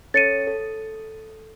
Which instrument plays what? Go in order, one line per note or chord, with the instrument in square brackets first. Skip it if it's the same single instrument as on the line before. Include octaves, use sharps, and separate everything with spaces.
[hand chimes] C#4 A4 C#5 [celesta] A6 C#7 D#7
[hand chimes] A4